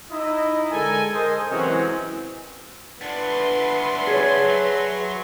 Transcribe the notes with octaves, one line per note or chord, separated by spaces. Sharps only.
D#4 E4 D#5
D3 G#3 A4 A#4 G#5
G#4 A#4 C5 D#5 G#5
C3 E3 F#3 G#3 C4 C#4
B3 D4 B4 E5 C6
G#4 C#5
F#3